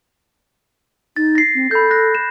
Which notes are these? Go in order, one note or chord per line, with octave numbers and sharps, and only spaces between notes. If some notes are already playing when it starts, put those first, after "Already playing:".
D#4 A6
A#6 C7
C4
A4 B5 G6
F#6 A#6
E7